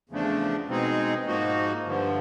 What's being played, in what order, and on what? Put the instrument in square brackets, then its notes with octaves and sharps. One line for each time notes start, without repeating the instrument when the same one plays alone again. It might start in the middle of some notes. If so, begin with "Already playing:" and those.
[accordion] E2 C#3 F3 A3 D4
B2 G#3 C4 D#4 G#4
G#2 F3 A#3 D#4 F#4
G2 D3 F3